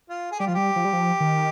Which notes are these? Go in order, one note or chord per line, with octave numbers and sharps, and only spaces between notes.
F4
G#4
G3 G4
F3 F4
G3 G4
F3
G3
F3
D#3